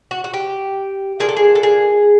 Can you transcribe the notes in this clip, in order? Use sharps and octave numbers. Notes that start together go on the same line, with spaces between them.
F#4
F#4
G4
F3 A#3 D4 G#4
A4
G#4
A4
G#4